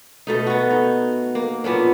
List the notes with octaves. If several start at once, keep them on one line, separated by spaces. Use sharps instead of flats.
B2 A3 D#4
B3 F#4
D#4
A#3
A#2 B3 C#4 D4